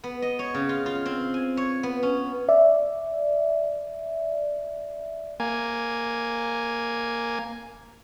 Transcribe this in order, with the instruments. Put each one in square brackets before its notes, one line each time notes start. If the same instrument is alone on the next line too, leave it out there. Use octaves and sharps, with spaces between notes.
[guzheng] B3
D#5
C#5
C#3
F4
F4
C4
G#5
C#5
B3
C#4
[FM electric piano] D5 E5
[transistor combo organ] A#3 G#5